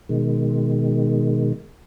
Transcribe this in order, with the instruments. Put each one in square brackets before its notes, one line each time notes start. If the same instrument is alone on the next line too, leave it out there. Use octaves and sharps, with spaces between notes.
[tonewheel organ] B2 D#3 G#3